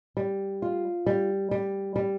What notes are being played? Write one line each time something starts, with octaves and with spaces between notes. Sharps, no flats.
G3
F4
G3
G3
G3